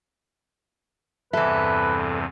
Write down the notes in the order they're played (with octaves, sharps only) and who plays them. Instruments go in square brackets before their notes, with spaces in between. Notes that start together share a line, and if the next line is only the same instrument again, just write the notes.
[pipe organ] E2 G2 C3 [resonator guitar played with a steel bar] E3 E5 [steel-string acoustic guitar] A4 [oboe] B4